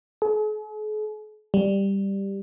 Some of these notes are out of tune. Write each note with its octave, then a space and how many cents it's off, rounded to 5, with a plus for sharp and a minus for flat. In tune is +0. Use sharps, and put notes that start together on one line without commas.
G#4 +45
G3 +5